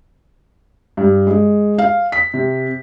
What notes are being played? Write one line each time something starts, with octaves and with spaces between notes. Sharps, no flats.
G2
G#3
F5
B6
C3